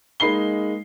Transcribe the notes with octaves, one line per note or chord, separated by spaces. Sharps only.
G#3 A#3 D#4 B5 C7 G7